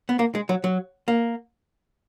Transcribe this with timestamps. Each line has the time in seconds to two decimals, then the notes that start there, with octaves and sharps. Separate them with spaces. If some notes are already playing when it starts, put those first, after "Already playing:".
0.09 B3
0.19 A#3
0.35 G#3
0.49 F#3
0.64 F#3
1.08 A#3